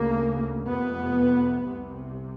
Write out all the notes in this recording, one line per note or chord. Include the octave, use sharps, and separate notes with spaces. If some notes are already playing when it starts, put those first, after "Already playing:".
Already playing: D2 C#3 A#3
F1 F2 C3 B3
C2 C3